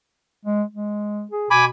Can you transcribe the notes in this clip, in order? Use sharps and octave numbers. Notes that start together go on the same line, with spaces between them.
G#3
G#3
G#4
B2 G#5 B5 D6